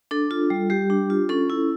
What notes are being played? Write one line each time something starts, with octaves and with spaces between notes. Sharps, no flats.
D4 A4
F4
G3
G3 G4
D4
F4
C#4 A4
E4